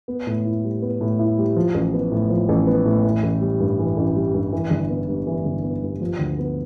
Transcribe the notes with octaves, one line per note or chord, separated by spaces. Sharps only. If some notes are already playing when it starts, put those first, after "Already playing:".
B3
A2
E4
G3
B3
A2
E4
G3
F3
A1
B3
A2
F3
A1
B3
A2
E3
A1
G3
G2
E3
A1
G3
G2
E3
G1
B3
G2
E3
G1
B3
G2
F3
D2
B3